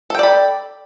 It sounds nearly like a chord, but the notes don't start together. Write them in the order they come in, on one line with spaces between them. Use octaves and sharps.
A4 G5 D5 B5